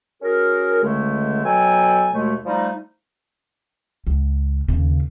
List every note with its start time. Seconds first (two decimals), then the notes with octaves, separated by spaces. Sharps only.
0.23 C#4 F#4 G#4 A#4
0.83 C#2 D3 G#3 A3
1.44 B2 F#3 A4 G5 G#5
2.13 D#2 B2 G#3 A3
2.46 F3 G3 A3 D#4
4.07 C#2
4.68 D#2 C#3